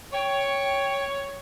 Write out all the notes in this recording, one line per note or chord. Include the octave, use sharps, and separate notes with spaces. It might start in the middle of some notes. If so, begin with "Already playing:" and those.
C#5 G5